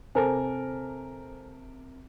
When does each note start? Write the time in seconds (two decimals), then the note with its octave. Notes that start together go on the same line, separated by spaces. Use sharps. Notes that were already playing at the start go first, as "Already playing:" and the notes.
0.15 C3 A4 A#4 C5 G#5 A5